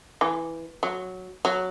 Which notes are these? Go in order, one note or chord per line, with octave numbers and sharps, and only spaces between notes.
E3
F#3
F#3